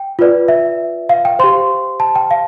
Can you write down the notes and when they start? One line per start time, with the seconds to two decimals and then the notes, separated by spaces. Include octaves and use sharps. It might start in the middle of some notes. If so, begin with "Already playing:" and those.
Already playing: G5
0.19 F4 B4 D5
0.48 E5
1.09 F5
1.25 G5
1.39 G4 C5 C6
2.00 A5
2.16 G5
2.31 F5